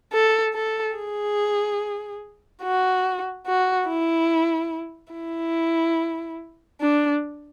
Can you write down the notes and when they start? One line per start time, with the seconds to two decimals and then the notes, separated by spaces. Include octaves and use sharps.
0.12 A4
0.54 A4
0.96 G#4
2.63 F#4
3.46 F#4
3.88 E4
5.13 E4
6.80 D4